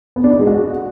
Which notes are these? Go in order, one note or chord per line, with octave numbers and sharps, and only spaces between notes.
B3
D4
D#4
G#3
F#4